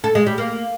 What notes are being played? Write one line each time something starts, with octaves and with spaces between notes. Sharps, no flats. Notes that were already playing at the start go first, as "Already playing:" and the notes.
A4
G#3
G3
A#3